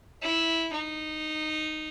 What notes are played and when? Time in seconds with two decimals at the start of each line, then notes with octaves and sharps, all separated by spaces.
0.22 E4
0.73 D#4